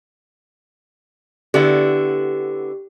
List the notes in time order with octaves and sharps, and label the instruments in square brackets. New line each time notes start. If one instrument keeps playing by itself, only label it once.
[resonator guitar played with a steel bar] D3 B3 E4 [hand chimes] G4